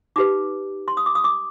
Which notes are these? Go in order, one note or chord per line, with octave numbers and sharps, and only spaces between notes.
D#4 G4 B4 D6
C6
D#6
D6
D#6
D6